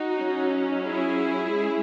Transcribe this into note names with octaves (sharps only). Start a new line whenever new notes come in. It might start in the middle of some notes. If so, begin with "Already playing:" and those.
Already playing: D#4 F#4
F#3 C#4
E4 G#4
G#3 C#4